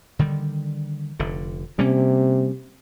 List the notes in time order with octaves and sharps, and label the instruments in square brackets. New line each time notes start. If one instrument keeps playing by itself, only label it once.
[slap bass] D3 D#3 G3
F1 D3
[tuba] C3 [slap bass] G3 A#3 C#4